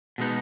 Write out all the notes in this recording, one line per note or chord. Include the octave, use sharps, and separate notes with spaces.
B2 G#3 B3 D#4